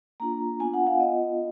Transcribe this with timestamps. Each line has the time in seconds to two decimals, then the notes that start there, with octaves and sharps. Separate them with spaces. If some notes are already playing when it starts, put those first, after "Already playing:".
0.20 A#3 D4 F4 A#5
0.60 B3 D4 F4 G#5
0.74 F#5
0.87 F5
1.00 B3 F4 D#5